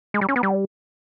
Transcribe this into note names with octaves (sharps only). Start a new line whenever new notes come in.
G#3
G3
C#4
B3
G3